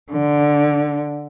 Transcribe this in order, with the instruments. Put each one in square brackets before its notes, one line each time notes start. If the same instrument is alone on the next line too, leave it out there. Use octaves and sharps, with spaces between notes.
[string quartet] D3